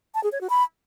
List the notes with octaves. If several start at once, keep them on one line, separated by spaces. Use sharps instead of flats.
A5
G#4
C#5
F#4
B5